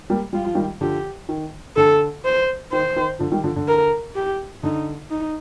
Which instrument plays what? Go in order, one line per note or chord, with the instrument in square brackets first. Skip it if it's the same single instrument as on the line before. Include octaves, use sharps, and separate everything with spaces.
[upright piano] G3 A#3
[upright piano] G3 [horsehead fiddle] F4
[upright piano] F3
D#3 G3
[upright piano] D3 F3 [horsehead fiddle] G4
[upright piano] D#3
[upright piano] D3 [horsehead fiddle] A4
[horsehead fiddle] C5
[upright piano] D#3 [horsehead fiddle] C5
[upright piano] D#3
D3 F3
D#3 G3
D3 F3
D3
[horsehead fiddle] A#4
G4
[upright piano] D3 [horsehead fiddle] D#4
[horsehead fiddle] D#4